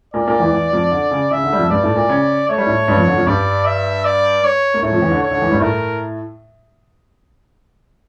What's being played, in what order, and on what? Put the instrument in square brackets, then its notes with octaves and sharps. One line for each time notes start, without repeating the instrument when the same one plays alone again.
[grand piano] A#2 A#3 [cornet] D5
[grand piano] A#2 A#3
E2 E3
E2 E3
F2 F3
D3
C#3
[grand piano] C#3 [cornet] E5
[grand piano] D3
G3
F2 F3
[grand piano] G2 G3 [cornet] D5
[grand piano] A2 A3
A#2 A#3
C#3 C#4
[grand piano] A3 [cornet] C#5
[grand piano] G3
A2 A3
G2 G3
F2 F3
D3
F2 F3
[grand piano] G2 G3 [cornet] D5
[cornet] E5
D5
C#5
[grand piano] A#3
[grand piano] A2 A3 [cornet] C#5
[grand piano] F2 F3
E2 E3
D3
[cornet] C#5
[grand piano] D3
E2 E3
G2 G3
[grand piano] A2 A3 [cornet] A#4